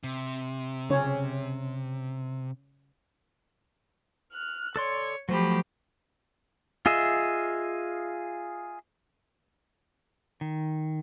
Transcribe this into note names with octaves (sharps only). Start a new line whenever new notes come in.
C3
C#3 C#4 C#5
F6 F#6
A4 C#5 D5 C6
F3 F#3 A3 G4 C5 B5
F4 G#4 D#5 E5
D#3